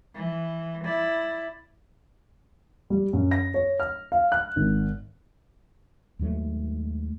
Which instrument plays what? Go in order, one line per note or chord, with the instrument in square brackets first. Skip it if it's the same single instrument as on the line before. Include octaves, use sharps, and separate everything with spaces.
[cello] E3
E4 D5
[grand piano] G3
F#2
A#6
C#5
F6
F5
F#6
G#1
[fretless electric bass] D#2 G#2 F#3 A3